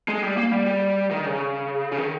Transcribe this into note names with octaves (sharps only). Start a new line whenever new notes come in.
G#3
G3
A#3
G3
G3
D#3
C#3
C#3
D#3